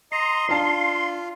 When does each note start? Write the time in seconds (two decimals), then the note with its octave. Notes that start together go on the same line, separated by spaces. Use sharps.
0.12 D#5 A#5 C6
0.49 D4 F4 F5 A5